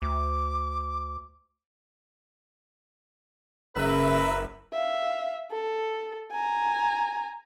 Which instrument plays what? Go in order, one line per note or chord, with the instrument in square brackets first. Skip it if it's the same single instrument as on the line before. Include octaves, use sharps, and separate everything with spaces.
[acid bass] D2 [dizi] D6
[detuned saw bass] F#1 [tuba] C#3 [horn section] A#4 B4 [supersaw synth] E5 E6
[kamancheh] E5 F5
A4
G#5 A#5